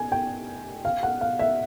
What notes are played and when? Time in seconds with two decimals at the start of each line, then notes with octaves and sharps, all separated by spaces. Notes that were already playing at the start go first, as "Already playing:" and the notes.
Already playing: G#5
0.12 G5
0.85 F5
1.03 F#5
1.21 F5
1.39 E5